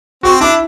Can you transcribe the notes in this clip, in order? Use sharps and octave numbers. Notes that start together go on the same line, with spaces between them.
C4 F#4
D4 E4